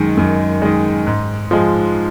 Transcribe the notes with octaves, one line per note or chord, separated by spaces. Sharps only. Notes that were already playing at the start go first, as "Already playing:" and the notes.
Already playing: F#2 D#3 G#3
F#2
D#3 G#3
G#2
F3 G#3